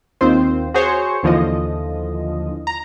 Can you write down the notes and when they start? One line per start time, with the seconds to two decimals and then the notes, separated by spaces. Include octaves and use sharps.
0.21 D#2 D#3 C4 F4 C5
0.74 F#4 G#4 C5 C#5 C#7
1.23 D#2 D3 E3 F3 F4 D#5
2.67 A#5